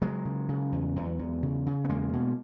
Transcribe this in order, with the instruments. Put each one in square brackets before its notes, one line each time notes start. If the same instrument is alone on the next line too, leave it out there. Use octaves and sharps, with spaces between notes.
[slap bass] C#3 F#3 G#3
C#3
C#3
E2
E2
E2
C#3
C#3
B3
E2 G#3 A#3
B2